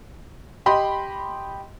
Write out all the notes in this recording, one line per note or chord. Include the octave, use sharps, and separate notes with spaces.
G4 D#5 B5 C6